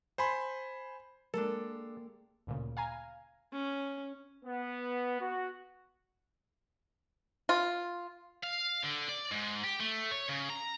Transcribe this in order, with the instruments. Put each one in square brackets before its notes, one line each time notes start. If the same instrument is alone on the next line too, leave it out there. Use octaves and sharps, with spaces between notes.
[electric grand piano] C5 G#5 B5 C6
[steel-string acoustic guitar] G#3 A#3 G4 [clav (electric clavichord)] D4 A4 [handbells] A#4
[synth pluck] D2 A#2 C#3
F5 G#5 A#5
[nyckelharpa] C#4
[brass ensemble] B3
F#4
[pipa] F4
[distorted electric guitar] F5
D3
D5
G#2
G4
A3
C#5
C#3
A#5